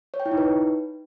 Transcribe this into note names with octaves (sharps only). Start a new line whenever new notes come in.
C#5
G5
E4
D#4
B4